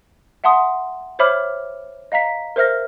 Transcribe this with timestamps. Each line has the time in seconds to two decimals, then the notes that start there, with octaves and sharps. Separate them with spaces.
0.44 E5 F#5 A5 C6 D#6
1.19 C5 C#5 E5 B5 D6 F6
2.12 D#5 F5 A#5 B6
2.56 A#4 C5 E5 F6 A#6